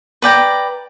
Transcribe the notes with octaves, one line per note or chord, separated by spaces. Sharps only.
B4 D5 G5 A#5